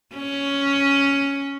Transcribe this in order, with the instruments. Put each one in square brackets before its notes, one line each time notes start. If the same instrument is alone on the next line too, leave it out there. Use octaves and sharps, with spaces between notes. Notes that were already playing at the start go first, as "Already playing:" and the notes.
[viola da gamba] C#4